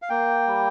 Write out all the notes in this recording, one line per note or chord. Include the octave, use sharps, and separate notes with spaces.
F5
A#3 G5
G3